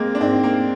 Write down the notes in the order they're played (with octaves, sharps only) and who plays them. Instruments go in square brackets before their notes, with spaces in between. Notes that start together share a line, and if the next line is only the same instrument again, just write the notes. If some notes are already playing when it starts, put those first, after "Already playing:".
Already playing: [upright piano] G#3 [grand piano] A#3 C4
[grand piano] D4
[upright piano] G#2 [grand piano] C4
[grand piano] A#3